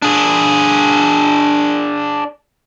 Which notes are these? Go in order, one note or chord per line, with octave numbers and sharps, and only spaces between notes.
D4 G#4